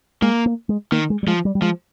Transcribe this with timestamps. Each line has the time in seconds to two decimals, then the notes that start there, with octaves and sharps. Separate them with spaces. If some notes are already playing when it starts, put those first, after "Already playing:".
0.22 G#3 A#3
0.46 A#3
0.69 G#3
0.92 D#3 A#3
1.10 G#3
1.23 G3
1.27 F3 G#3
1.45 G3
1.55 G3
1.62 F3 G#3